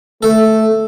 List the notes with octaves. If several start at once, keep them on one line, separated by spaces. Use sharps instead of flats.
A3 A4